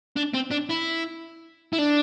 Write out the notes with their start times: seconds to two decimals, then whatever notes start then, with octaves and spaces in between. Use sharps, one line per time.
0.17 D4
0.34 C4
0.51 D4
0.70 E4
1.73 E4
1.78 D4